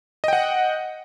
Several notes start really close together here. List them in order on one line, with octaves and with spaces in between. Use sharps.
D#5 G5 F#5